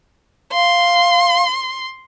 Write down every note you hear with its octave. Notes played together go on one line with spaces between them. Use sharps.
F5 C6